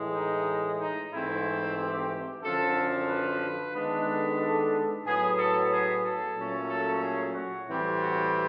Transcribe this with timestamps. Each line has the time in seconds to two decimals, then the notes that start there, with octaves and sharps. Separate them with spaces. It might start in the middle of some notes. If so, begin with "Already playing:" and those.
Already playing: A2 E3 G#3
0.14 D#4
0.79 D#4
1.12 G#2 E3 A3 C4 E4
1.77 G4
2.43 F#2 D3 F3 A4
3.09 B4
3.74 D#3 G#3 B3 D4
4.06 A4
4.39 A4
5.05 A2 F#3 B3 G#4
5.37 A4
5.71 G#4
6.03 A4
6.36 A#2 F#3 A3 C#4
6.69 A4
7.01 G#4
7.34 F#4
7.67 A2 E3 G3 C4
8.00 F#4